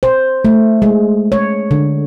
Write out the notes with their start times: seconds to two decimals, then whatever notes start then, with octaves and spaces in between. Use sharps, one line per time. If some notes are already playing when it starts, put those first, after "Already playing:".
0.03 C5
0.45 A3
0.82 G#3
1.32 C#5
1.71 D3